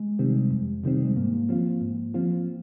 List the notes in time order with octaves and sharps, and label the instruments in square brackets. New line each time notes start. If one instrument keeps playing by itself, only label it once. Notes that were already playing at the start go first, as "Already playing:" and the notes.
Already playing: [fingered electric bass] G#3
[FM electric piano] C3 D#3 G3 C4
F2
C3 D#3 G3 C4
[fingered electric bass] G#3
[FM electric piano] G#2 [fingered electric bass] A#3
[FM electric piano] F3 C4 F4
G#2
F3 C4 F4